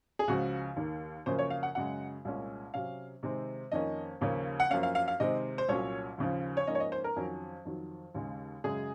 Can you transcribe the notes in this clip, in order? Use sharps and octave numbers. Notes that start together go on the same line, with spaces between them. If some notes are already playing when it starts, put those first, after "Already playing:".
G#4
C#2 C#3 F3 F#4
D#2 D#3 A#3
F#2 C#3 F3 A#3 C#4 C5
C#5
F5
F#5
F#2 C#3 G#3 F#5
C2 A#2 G#3 C#4
C3 F#3 C#4 F5
C3 D#3 G#3 C4
F2 D#3 A#3 C#4 D#5
D#2 C#3 F3 A#3 C#4
F#5
F#2 F3 A#3 C#4 F5
F5
F5
F5
C3 D#3 G#3 C4 D#5
C5
C2 A#2 F#3 C#4 C#5
D#2 C#3 F3
C#5
G#2 F3 A#3 C#4 D#5
C#5
D#5
C5
A#4
F2 D#3 F#3 C#4
F2 D#3 F#3
D#2 C#3 G#3
F#2 C#3 G#3 G#4